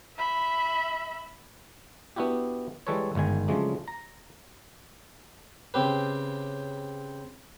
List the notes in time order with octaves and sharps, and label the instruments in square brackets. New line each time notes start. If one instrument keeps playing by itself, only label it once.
[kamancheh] E5 B5
[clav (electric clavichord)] B3 D4 E4 F#4 G4
E3 G3 G#3 A4 B4 C#5
G1 G#2 D#3 G#5
C#3 F3 F#3 G#3 A3 D4
A#5
[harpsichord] C#3 C4 G4 B4